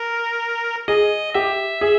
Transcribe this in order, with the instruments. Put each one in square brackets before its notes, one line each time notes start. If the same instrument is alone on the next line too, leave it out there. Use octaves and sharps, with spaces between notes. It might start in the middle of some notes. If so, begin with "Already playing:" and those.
Already playing: [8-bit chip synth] A#4
[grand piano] G#4 [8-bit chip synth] D#5
[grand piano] G4 [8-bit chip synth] E5
[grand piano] G#4